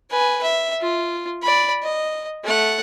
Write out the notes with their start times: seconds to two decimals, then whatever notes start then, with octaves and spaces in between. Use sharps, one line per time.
0.11 B4 G#5
0.43 E5
0.81 F4
1.42 D5 B5
1.83 D#5
2.44 A3 F#5